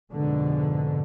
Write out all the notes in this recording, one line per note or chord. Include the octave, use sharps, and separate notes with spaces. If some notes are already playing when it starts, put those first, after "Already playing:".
F2 G#2 B2 D3